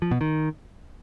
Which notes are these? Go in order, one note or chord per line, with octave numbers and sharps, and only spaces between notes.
F3
B2
D#3